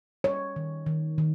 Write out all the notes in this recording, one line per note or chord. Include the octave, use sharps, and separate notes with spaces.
G3 C#5
D#3
D#3
D#3